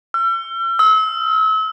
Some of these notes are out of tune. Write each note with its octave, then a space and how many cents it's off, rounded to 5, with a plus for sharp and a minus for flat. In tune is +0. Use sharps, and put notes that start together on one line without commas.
E6 +45
E6 -35